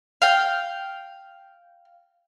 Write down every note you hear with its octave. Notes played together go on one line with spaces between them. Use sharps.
F5 G5